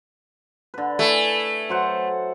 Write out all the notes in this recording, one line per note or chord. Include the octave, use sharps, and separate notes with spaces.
D3 B4
A3 E4 A4 G#5
F#3 C5 F#5